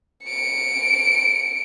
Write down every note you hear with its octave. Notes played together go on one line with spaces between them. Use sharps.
C#7 D7